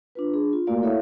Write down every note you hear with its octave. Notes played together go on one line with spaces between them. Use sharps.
D4 F4 B4
D4 G#4
F4
A3 A#3 F#4 A#4 D5 F5
E4 A4 C#5 E5 F5